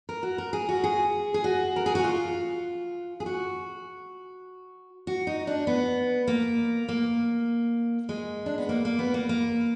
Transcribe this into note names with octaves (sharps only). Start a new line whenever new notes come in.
A#4
F#4
A#4
G#4
F#4
G#4
G#4
F#4
A#4
G#4
F#4
F4
G#4
F#4
F#4
D#4
D4
B3
A#3
A#3
G#3
D4
B3
A#3
A#3
B3
A#3
A#3